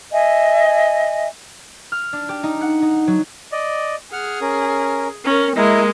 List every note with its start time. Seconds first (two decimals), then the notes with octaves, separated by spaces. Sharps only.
0.13 D#5 E5 G#5
1.92 F6
2.13 D4
2.29 G4
2.43 D#4
2.61 F#5
2.82 D#4
3.07 F#3
3.52 D5 D#5
4.13 G#4 F#5 F6
4.41 C#4 A#4
5.25 C#4 A#4 A#5
5.56 G#3 A#3 E4 A#4 D#5